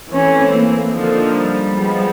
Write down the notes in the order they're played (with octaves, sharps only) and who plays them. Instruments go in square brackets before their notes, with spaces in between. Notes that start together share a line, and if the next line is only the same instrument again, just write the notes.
[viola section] E3 A3 C4 [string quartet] C#4
[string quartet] A#3
[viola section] D3 F3 A#3 D#4
[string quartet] G3
[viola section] F3 G#3 B3